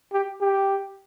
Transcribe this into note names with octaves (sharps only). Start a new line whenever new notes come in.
G4
G4